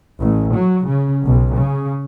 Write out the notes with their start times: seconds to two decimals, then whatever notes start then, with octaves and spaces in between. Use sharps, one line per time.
0.19 A1
0.54 F#3
0.86 C#3
1.24 B1
1.55 C#3